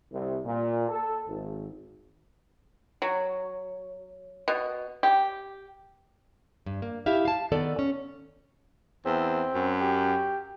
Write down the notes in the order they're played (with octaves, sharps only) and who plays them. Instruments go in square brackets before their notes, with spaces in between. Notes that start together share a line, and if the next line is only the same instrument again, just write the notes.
[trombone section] C2
A#2
A4
G#1
[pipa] F#3
B2
G4
[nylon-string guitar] G2
A#3
E4 G4 E5 F5
F5 A5
D#3 B3 A4 D5
C#4
[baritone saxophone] E2 [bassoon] C4
[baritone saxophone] F#2
[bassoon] G4